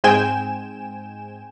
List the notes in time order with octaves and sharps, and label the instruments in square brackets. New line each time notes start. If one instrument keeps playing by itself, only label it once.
[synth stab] G#2 G#3 C4 G5 G#5 E7